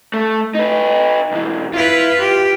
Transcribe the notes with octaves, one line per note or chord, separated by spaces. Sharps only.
A3
D#4 B4
B1 E3
E4 F4 B4
G4